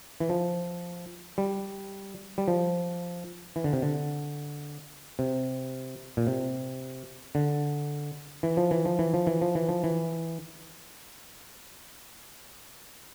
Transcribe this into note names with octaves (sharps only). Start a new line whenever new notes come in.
E3
F3
G3
G3
F3
E3
D3
C3
D3
C3
A#2
C3
D3
E3
F3
E3
F3
E3
F3
E3
F3
E3
F3
E3